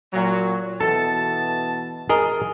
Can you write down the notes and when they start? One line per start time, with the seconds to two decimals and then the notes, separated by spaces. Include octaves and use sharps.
0.13 A#2 F#3
0.81 B2 E3 A4 A5
2.09 G#4 A#4 D#5